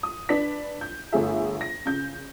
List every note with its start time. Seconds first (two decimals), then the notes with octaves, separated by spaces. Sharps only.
0.03 D#6
0.29 D4 B4 B6
0.81 G6
1.13 G1 A3 G#4 E5
1.61 A#6
1.86 C#3 G6